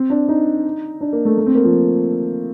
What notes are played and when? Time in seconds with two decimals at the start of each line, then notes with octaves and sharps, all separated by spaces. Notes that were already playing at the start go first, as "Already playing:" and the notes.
Already playing: C4
0.10 D4
0.28 D#4
1.01 D4
1.13 A#3
1.25 A3
1.38 A3
1.46 C4
1.55 A#3
1.64 F3